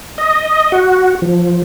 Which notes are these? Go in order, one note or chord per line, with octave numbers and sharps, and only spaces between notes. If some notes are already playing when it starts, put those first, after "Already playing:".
D#5
F#4
F3